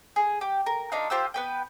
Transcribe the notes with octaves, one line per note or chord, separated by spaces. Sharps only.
G#4
G4
A#4
D4 D#4 F4
F4 G4 C5 E6
B3 B4 G5